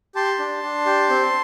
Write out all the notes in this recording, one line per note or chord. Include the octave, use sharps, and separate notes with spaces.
G4 A5 C6
D4
D4
G4
C4